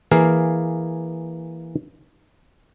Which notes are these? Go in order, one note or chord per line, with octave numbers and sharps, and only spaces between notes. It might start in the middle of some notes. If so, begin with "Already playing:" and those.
E3 A#3 G#4 F5